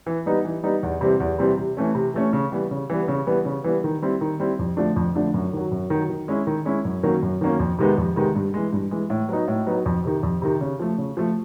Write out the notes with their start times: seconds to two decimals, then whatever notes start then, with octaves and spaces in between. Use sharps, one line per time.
0.06 E3
0.26 G3 B3 D#4
0.45 E3
0.64 G3 B3 D#4
0.83 E2
1.01 C3 E3 G3 C4
1.20 E2
1.39 C3 E3 G3 C4
1.57 C3
1.77 E3 A3 C#4
1.95 C3
2.14 E3 A3 C#4
2.33 C#3
2.52 E3 G3 B3
2.71 C#3
2.90 E3 G3 B3
3.08 C#3
3.27 E3 G3 B3
3.45 C#3
3.64 E3 G3 B3
3.84 D#3
4.02 G3 C4 E4
4.21 D#3
4.40 G3 C4 E4
4.59 F2
4.77 D3 F3 A3 D4
4.96 F2
5.15 D3 F3 A3 D4
5.34 F#2
5.53 D#3 F#3
5.71 F#2
5.90 D#3 F#3
6.09 D#3
6.28 G#3 C#4 E4
6.47 D#3
6.65 G#3 C#4 E4
6.85 F#2
7.03 D#3 F#3 A#3 C#4
7.23 F#2
7.41 D#3 F#3 A#3 C#4
7.59 F2
7.79 C3 D#3 G#3 B3
7.98 F2
8.16 C3 D#3 G#3 B3
8.35 G2
8.54 E3 G#3
8.73 G2
8.91 E3 G#3
9.10 A2
9.29 F#3 B3 D#4
9.48 A2
9.67 F#3 B3 D#4
9.86 F2
10.05 C3 D#3
10.23 F2
10.42 C3 D#3
10.61 C#3
10.80 F3 A3
10.98 C#3
11.17 F3 A3